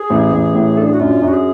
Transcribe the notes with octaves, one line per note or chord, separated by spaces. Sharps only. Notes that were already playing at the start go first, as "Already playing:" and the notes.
Already playing: G#4
A1
A1
A2
D4 A4
G#4
F#4
F#2 F4
F#2
F#4
G#4